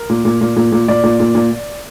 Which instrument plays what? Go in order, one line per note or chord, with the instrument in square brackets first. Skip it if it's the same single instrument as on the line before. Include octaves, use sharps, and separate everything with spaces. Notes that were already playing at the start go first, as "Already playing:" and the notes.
Already playing: [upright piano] A#4
A#2
A#2
A#2
A#2
A#2
A#2 D5
A#2
A#2
A#2